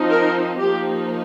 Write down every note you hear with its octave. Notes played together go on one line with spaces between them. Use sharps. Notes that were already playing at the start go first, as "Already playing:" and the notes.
Already playing: F3 C4 D#4
A#4
F3 A#3 D#4 G4